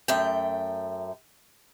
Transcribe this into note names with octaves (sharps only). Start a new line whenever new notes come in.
F#2 A3 G5